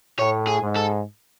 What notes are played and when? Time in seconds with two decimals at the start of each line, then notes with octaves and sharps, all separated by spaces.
0.19 A2 C#5
0.47 G#4
0.62 G#2
0.76 A4